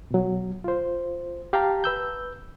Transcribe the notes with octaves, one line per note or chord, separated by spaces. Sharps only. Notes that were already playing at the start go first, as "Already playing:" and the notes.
B2 F#3
F4 C5
G4 F5 G5 A5 A#5
B4 E6 G6